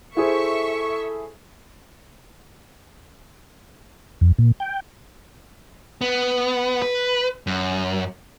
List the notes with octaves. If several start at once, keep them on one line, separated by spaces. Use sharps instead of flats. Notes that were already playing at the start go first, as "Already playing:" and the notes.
E4 G#4 A4 C5 E5 C#6
F2
A#2
G5
B3
B4
F#2